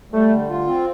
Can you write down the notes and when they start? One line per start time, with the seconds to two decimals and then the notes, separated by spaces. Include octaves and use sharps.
0.12 G3 A3
0.31 D3
0.49 F4
0.67 C4